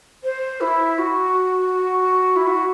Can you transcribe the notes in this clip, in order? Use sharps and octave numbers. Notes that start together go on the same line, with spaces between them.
C5
E4
F#4
E4
F#4